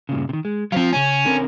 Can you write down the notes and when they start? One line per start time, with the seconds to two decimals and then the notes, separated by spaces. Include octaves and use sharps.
0.09 G2 A#2 C#3
0.29 C3 D#3
0.45 G#3
0.72 F3 F#3 C4 C5 F5
0.93 C#3 C#4 G#5
1.25 D3 C4 A#4